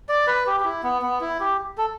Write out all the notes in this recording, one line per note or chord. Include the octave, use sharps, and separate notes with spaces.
D5
B4
G4
G4
E4
B3
B3
E4
G4
A4